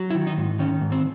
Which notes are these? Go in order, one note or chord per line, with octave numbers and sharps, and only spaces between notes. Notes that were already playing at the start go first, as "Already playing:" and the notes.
Already playing: F#3
E4
D#3
D#4
G#2
D#3 C#4
G#2
C4